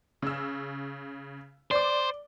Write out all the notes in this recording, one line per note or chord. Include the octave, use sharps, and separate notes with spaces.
C#3 E6
C5 D5 D6